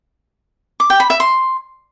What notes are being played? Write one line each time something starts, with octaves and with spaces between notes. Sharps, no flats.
D6
G5
B5
E5
C6